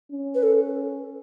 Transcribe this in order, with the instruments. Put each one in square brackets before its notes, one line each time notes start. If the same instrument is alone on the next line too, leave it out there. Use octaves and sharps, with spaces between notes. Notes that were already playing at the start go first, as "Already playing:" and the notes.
[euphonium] C#4
[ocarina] B4
A4